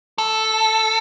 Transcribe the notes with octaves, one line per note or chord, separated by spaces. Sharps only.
A4